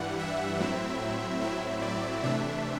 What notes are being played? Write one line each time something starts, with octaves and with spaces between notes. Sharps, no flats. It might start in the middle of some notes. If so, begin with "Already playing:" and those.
Already playing: G2 E3 G3 F#5
E5
A2 F#3 C4 E4
A2 F#3 C4 E4 E5
D5
C3 E3 A3 D4 E5